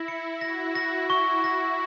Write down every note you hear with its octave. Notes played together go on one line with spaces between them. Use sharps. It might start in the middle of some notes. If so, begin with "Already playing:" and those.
Already playing: E4 A#6
C#7
F#4 A#6
A#6
C#6
A#6